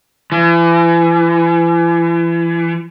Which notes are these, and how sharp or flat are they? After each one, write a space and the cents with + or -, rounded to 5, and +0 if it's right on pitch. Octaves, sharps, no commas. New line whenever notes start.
E3 +35